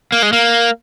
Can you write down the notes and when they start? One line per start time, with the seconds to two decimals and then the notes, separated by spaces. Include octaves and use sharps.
0.12 A#3
0.22 G#3
0.33 A#3